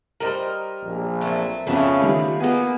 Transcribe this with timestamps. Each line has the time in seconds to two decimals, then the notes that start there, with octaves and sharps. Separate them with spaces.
0.20 G3 A#4 C5 D#5
0.84 A#1
1.21 F#3 A3 C4
1.67 F2 C#3 B3 D4 E4 F4
2.01 D#3 G3 A3
2.40 A#3 B3 D#4 G#4